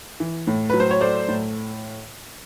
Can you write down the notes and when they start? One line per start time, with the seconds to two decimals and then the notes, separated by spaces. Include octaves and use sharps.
0.20 E3
0.47 A2
0.70 F#3 B4
0.80 C5
0.91 C#5
1.01 A3 C5 D5
1.28 A2